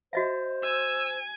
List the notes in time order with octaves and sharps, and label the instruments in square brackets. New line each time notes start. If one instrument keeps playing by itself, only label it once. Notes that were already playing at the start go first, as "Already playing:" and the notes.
[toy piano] F#4 D#5 E5 [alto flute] C5
[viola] G#5 [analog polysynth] E6